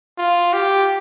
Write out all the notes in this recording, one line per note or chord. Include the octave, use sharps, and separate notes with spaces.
F4
G4